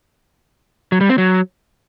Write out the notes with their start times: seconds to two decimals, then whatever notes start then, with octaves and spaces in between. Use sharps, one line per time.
0.92 F#3
1.01 G3
1.09 C4
1.18 F#3